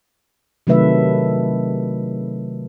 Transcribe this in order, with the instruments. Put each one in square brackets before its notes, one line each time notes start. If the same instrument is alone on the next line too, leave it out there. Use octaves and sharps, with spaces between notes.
[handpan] C3 D#3 F#3 A3 B4 E5